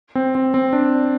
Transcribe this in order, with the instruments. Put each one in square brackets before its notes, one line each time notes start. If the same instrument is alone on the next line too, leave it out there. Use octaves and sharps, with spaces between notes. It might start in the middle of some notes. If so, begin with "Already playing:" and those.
[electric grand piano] C4
C4
C4
D4